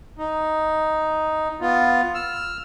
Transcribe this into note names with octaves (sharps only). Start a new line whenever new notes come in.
D#4
B3 F4
E6 F6